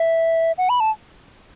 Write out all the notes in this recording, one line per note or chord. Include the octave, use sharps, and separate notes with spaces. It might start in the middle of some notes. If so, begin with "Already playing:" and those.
Already playing: E5
F#5
B5
A5